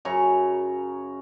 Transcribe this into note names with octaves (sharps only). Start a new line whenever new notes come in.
F#2 C#3 A#5 C#6